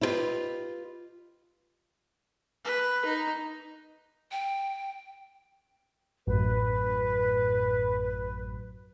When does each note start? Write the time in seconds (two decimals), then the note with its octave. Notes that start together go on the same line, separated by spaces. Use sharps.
0.01 E4 F4 G4 A#4 B4 D#5
2.64 B4
3.05 D#4
4.31 G5
6.27 A1 F#2 B4